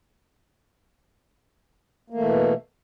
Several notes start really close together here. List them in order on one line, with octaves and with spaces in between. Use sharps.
A#3 A3 E3 B2